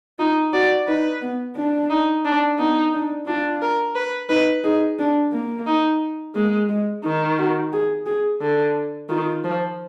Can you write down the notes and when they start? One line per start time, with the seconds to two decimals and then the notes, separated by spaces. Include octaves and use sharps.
0.19 D#4 F4
0.53 F#4 D5
0.88 D#4 B4
1.21 B3
1.56 D4
1.90 D#4
2.25 D4
2.59 B3 D#4
2.94 D4
3.27 D4 F4
3.62 A#4
3.95 B4
4.29 D#4 B4
4.64 D#4 G#4
4.99 D4
5.33 A#3
5.67 D#4
6.35 G#3 A#3
6.69 G#3
7.04 D#3 D#4
7.38 F#4
7.73 G#4
8.06 G#4
8.41 D3
9.09 D#3 F4
9.44 F3